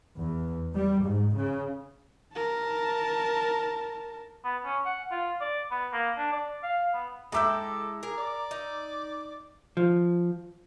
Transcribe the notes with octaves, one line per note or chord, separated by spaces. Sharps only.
E2
G3
G#2
C#3
A#4 A5
B3
C#4
F#5
F4
D5
B3
A#3
D4
D5
F5
B3
G#3 E4 A4 G5 A#5 D6 E6
G#4 A#4
D5
D#4
F3